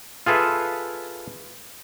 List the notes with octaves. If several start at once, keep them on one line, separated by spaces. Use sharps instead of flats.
F4 G#4 A4 B4 E5